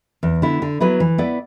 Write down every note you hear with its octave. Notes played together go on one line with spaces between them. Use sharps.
E2
D3 B3 E4
D3
F#3 B3 E4 B4
E3
B3 E4 D5